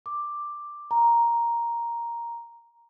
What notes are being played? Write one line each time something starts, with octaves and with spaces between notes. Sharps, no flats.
D6
A#5